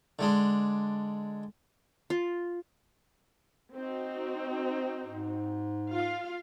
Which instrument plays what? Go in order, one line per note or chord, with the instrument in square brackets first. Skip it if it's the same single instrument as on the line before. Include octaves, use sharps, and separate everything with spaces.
[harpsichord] D3 G#3 D4
[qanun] F4
[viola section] C4 D#4 F#4
[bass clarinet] G#2
[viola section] F4 F5